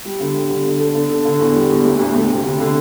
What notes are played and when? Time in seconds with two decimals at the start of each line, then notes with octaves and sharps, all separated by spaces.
0.05 G3
0.20 D3
0.34 G3
0.50 D3
0.65 D3
0.80 A4
0.95 D3
1.10 A4
1.25 D3
1.40 E2
1.55 G3
1.70 E2
1.85 D2
2.00 D2
2.15 D2
2.30 C3
2.44 D3
2.60 D3